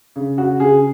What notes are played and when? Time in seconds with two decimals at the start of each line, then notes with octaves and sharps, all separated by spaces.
0.16 C#3
0.38 C#3 F#4
0.60 C#3 G#4